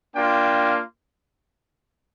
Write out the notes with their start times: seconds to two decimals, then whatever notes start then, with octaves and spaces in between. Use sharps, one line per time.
0.16 A#3 D4 F4 G5